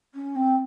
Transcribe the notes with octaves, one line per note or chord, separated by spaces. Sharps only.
C#4
C4